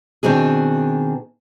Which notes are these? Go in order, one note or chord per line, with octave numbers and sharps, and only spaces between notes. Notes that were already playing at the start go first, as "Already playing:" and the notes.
B2 D#3 C4 D4 G#4